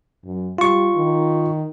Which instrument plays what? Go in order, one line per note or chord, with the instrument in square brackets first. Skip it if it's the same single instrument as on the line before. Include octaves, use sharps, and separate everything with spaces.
[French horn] F#2
[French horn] G3 [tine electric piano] F4 C#6
[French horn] D#3